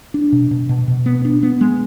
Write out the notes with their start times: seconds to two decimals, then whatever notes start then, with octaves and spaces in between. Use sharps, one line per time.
0.14 D4
0.32 B2
0.51 B2
0.69 B2
0.88 B2
1.06 B3
1.25 D4
1.43 B3
1.61 G#3